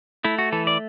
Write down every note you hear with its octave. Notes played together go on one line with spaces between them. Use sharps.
A3 E4
F#4
E3 A4
D5